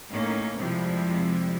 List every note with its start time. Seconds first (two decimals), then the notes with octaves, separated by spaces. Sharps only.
0.11 A2 A#3 C#4 D#4
0.59 F2 C3 F3 G3 G#3 E4